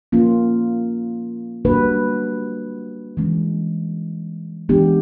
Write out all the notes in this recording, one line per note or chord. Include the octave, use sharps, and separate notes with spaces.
F3 A#3 C#4 F4
G3 A#3 D4 F#4 B4
E3 G#3 C#4
E3 G#3 B3 D4 G4